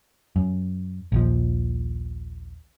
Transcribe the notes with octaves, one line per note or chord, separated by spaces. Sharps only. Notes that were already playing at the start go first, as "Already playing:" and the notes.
F#2
A#1 D#2 F3